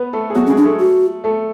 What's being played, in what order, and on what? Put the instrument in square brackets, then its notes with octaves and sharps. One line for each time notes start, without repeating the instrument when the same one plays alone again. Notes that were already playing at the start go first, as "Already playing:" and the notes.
Already playing: [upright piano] B3 B4
A3 A4
G#4
[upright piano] F#3 F#4 [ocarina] B3
[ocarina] C#4
[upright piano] G#3 G#4
[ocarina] D4
[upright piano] A3 A4
[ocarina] F#4
[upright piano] A3 A4